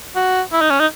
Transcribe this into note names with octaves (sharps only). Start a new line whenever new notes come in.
F#4
E4
D#4
C#4
D#4